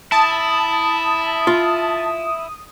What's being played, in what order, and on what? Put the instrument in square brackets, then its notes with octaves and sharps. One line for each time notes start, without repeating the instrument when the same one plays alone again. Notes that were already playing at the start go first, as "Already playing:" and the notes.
[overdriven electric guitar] E4 [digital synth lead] A5 [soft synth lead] D#6
[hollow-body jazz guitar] F4